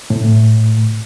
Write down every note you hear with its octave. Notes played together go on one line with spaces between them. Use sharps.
A2